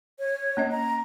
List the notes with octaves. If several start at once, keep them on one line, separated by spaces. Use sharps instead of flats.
C#5
A#3 C#4 D#5
A#5